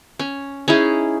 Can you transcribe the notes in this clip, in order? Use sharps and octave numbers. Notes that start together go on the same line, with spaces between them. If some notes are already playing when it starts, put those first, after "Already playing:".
C#4
C#4 D#4 E4 G#4